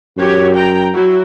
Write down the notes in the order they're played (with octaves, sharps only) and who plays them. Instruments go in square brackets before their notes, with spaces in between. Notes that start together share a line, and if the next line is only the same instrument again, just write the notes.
[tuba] F#2 [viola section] F#4 G4 C#5
[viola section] G5 A#5
F#3 E4 F#4